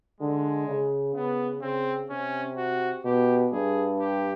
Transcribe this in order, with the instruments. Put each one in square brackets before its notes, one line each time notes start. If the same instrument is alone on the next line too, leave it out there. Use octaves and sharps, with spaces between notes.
[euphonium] D3 [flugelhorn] G#3
[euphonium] C#3
[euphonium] C#3 [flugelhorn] B3
[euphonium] C#3 [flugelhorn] C4
[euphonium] C3 [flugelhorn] C#4
[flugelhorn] F#4
[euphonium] B2 [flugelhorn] G4
[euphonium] G2 [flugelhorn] G#4
[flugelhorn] G4